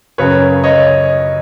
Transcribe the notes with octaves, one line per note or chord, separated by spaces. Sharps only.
F#2 C#3 F#3 B4 C#5
C#5 D#5